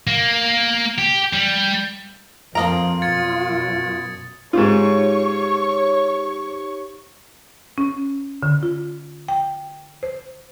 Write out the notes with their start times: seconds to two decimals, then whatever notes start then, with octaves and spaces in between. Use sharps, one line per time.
0.07 A#3
0.98 G4
1.33 G3
2.55 F2 F3 A#3 C4 F4 A#5 D#6 D7
3.02 F#2 B2 G#6 A6 C#7
4.53 G#2 D#4 F4 G4 C5 C#5 C#6
7.78 C#4
8.43 D3
8.63 F4
9.28 G5
10.03 C5